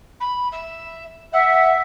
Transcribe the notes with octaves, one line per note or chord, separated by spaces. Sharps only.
B5
E5
E5 F#5